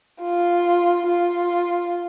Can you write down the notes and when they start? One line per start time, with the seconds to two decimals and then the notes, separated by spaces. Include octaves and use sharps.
0.22 F4
1.07 F4